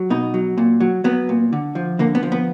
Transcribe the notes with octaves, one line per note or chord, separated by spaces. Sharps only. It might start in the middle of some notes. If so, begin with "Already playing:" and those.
Already playing: F#3
B2 D#4
F#3
A#2
F#3
F#3 B3
A#2
D3
F3
D3 A#3
B3
F3
B3